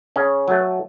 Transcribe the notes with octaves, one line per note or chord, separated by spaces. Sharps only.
C#3 C#4
F#3 A3